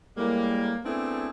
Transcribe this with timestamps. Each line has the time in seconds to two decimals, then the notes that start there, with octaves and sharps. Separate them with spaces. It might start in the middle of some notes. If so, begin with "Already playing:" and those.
0.17 A2 G3 G#3 A#3
0.84 A3 B3 C4 D4 E4 G#4